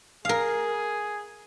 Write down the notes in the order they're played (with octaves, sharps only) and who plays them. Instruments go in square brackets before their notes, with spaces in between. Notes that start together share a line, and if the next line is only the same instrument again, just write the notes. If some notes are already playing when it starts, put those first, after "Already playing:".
[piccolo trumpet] G#4 [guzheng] A#4 F5